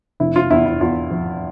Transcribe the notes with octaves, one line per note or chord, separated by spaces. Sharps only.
F1 E4
F4
E2 E4
E4
E2 F4
F3